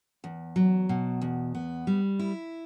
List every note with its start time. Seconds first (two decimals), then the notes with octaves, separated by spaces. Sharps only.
0.24 E2
0.56 F#3
0.89 B2
1.22 E2
1.55 B3
1.87 G3
2.19 E4